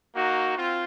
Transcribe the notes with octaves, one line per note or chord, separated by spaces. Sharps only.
A#3 D#4 F#4
C4 F4